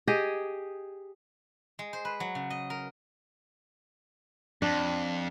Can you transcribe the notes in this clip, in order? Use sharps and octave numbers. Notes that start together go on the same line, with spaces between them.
G4 G#4 D#5
G#3
C5
B4
F#3
C#3
D#5
A#4
F2 D4